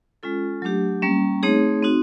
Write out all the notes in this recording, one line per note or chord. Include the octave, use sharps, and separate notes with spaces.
G#3 C#4 F4 A4
F#3 A3 D4 G4
G3 A#3 C#4
A3 C4 D#4 G#4 C#5
C4 D#4 F#4